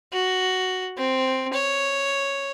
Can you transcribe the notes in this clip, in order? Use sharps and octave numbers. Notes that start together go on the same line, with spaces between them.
F#4
C4
C#5